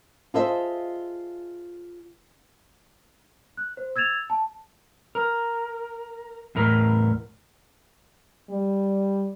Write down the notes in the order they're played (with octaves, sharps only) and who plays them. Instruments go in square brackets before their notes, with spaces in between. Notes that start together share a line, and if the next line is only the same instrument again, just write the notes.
[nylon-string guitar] F4 G#4 A4 C5 D#5 E5
[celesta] F#6
C5
E6 G#6 A6 E7 F7
A5
[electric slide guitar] A#4
E2 A2 A#4
[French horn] G3